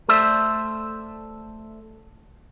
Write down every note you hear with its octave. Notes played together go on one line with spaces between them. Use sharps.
A3 A4 C5 D5 E5